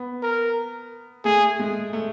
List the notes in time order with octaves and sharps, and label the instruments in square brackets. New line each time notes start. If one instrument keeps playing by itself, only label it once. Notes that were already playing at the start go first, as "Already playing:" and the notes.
Already playing: [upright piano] B3
[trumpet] A#4
[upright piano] A3 [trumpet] G#4
[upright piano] G#3
A3